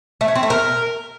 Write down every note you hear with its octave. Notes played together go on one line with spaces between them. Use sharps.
A3
C#4
C4
A3
A#4